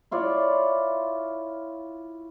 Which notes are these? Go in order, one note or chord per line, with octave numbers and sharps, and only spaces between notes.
E4 F4 C#5 D5